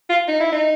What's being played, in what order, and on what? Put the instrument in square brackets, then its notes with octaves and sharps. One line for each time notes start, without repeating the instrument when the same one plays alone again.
[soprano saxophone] F4
D#4
E4
D#4